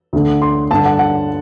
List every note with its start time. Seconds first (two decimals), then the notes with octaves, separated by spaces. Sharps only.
0.13 D2 D3
0.42 C6
0.71 G2 D3 A5
0.85 F#5
0.99 F#5